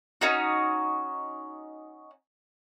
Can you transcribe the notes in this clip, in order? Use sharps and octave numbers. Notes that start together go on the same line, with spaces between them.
C#4 D#4 F#4